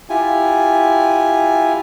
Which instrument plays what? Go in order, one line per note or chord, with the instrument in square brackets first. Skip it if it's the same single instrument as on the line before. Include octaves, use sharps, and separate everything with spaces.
[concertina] E4 F4 G4 G#5